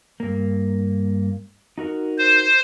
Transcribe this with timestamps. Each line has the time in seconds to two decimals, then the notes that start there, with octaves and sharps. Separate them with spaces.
0.20 G2 A#3
1.78 D#4 F#4 A#4
2.18 C5